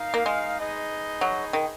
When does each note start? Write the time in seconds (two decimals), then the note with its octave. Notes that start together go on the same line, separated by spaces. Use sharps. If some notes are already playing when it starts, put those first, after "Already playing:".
Already playing: D#4 A#4 F5
0.14 A#3
0.26 G#3
0.58 D#4 G#4 B4 D#5
1.21 F#3
1.53 D#3